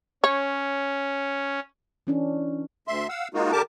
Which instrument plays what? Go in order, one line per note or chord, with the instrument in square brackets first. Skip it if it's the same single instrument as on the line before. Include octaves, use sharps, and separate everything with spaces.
[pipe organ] C#4 [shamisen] C#5
[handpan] E3 C#4 D4
[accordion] D2 E5 C6
F5 F#5 E6
G#3 A#3 D#4 F4 F#4
D3 G4 A#4 A5 D6